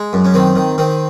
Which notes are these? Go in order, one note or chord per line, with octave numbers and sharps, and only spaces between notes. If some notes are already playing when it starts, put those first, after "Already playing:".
Already playing: G#3
F#2
C#4
D#3 C4
D#3
D#3 C4